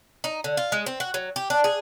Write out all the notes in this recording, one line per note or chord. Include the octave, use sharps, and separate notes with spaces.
D#4
D3
F4
G#3
C4
F#4
F#3
G4
D4
G#4